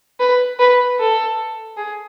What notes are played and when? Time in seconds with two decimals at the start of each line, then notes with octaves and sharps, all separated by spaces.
0.20 B4
0.59 B4
0.99 A4
1.77 G#4